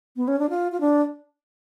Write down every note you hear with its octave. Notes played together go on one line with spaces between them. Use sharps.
B3
C#4
D4
F4
F4
D4